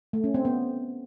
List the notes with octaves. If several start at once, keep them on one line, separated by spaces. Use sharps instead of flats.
A3
C#4
C4
B3